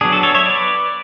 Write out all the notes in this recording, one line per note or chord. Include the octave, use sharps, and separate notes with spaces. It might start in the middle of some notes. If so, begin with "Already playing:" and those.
F#3 B3 D4 G#4
F#4 A4
A4 C#5
C#5 E5
B4 D5